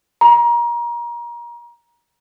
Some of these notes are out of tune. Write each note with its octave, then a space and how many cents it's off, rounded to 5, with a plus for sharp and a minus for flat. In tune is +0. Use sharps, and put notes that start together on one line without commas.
A#5 +30